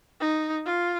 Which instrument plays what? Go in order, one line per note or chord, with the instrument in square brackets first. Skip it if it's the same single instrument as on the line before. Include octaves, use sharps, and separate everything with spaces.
[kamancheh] D#4
F4